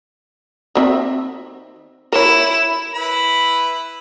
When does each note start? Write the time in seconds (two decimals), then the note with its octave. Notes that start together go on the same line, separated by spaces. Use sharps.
0.75 D#3 C4 E5
2.12 E4 A#4 C#5 E7
2.95 E4 B4 B5